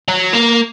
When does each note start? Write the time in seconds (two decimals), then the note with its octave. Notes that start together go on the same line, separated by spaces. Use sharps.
0.08 F#3
0.33 A#3